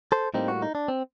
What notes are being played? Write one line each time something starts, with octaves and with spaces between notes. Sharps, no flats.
A4 C5
A2 G3 A#3 C4 D#4
F#4
D#4
D4
C4